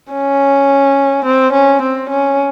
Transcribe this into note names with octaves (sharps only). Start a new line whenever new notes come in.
C#4
C4
C#4
C4
C#4